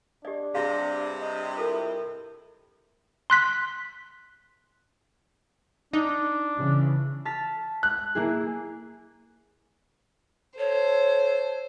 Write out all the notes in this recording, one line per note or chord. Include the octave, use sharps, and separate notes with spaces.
D4 G4 D5 D#5
G2 C3 F#4 G#4 F5 A#6
D#5
E4 F4 A4 A#4
C6 F#6 B6
D4 D#4
C#3 E3
A5 F6 B6
F#6
A#3 E4 G#4
A4 C5 C#5